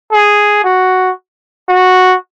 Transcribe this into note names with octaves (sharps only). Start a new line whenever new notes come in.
G#4
F#4
F#4